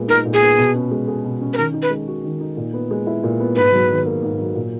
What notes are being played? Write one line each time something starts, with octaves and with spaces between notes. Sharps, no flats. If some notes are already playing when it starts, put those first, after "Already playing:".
Already playing: A#2 G#3 B3
D#4 A#4
A#2
G#4
B3
B2
C#4
G#3
G#4
B2
C#4
B4
D#3 A#4
D#4
B4
G#3
F#4
D#3
D#4
A#2
B3
G#3
E4
A#2
B3
G#2 B4
F#3
D#3
A#3
G#2
F#3
A#2